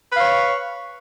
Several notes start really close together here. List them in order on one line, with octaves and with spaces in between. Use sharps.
B4 F5 C#5